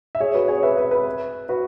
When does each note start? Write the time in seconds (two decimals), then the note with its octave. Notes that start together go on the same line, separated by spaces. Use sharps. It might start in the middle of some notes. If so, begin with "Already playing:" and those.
0.15 E5
0.20 G#4 C#5
0.34 F#4 B4
0.48 G#4 C#5
0.63 B4 E5
0.77 B4 E5
0.91 B4 E5
1.49 F#4 B4